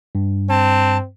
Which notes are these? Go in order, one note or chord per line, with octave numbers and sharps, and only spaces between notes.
G2
C4 A5